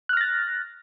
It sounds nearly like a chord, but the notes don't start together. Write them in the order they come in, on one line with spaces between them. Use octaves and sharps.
F#6 F6 A#6 A6